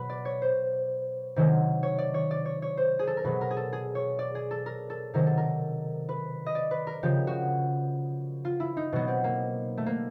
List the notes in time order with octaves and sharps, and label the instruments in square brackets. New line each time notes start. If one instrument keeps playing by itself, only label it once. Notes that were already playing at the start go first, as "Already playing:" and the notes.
Already playing: [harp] B2 F#3 B4
D5
C#5
C5
C3 D#3 F#3
C#5
D5
C#5
D5
C#5
C#5
C5
G#4
A4
A#4
B2 F#3 B4
A#4
G#4
A4
G#4
C#5
D5
G#4
A4
A#4
A4
C3 D#3 F#3 A#4
A4
A#4
B4
D#5
D5
B4
A#4
C#3 F3 G4
F#4
F4
E4
D#4
B2 F#3 B3
C4
A#3
A3
A#3